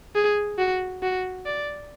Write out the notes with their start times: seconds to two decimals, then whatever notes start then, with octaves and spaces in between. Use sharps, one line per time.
0.15 G#4
0.58 F#4
1.02 F#4
1.46 D5